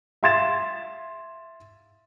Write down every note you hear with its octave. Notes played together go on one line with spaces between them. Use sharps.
E5 F5 C6 G#6 A6 E7